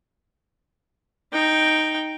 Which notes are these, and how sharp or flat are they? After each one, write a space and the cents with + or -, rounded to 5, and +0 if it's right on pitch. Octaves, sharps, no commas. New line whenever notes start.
D#4 +0 G5 +0